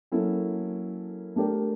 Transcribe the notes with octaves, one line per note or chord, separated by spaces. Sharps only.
F#3 A#3 C#4 E4 A4
A3 D4 G4 A#4